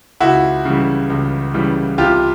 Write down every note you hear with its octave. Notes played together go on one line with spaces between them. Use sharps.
C#2 E4 F#4
C#3 E3 G3
C#2
C#3 E3 G3
C2 F4 G4